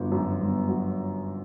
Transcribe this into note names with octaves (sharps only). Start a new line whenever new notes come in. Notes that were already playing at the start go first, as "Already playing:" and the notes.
Already playing: G1 F#3
F#2
G1
F#3